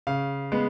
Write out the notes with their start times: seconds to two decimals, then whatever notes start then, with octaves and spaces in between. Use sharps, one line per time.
0.07 C#3 F5
0.52 G#3 B3